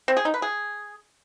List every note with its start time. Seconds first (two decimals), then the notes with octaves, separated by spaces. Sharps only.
0.08 C4
0.17 G#4
0.25 D#4
0.34 B4
0.42 G#4